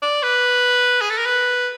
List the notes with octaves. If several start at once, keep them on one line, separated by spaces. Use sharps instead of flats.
D5
B4
G#4
A4
A#4
B4